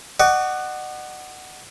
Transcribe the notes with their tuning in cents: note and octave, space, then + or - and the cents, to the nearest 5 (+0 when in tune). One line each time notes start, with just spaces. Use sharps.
D#5 -40 F#5 +10 C#6 +40